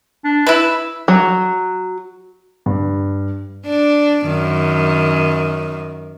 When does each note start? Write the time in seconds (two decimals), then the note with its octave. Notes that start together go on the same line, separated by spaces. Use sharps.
0.24 D4
0.47 E4 B4 E5
1.08 F#3
2.66 G2
3.66 D4
4.26 F#2 D#3